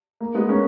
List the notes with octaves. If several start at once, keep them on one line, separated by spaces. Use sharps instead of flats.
A#3
G#3 B3
A#3 C#4